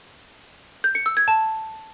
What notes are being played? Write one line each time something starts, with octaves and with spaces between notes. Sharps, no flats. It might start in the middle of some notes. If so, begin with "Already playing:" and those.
G6
C#7
E6
G#6
A5